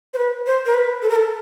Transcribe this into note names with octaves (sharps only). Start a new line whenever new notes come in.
C5
B4
C5
A#4
B4
A4
A#4
A4